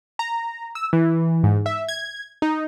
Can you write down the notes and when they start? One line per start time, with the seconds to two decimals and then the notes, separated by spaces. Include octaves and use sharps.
0.19 A#5
0.75 E6
0.93 E3
1.43 G#2
1.66 E5
1.89 G#6
2.42 D#4